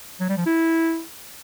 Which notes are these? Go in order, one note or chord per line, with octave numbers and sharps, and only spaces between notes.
F#3
G3
F3
E4